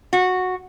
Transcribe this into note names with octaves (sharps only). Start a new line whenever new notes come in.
F#4